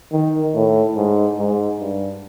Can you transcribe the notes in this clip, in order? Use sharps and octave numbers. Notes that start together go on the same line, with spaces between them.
D#3
A2
G#2
G#2
G2